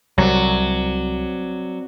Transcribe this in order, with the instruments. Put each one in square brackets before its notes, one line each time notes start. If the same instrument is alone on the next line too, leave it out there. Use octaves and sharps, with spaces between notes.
[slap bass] C2 [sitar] F#3 [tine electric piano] C4 D5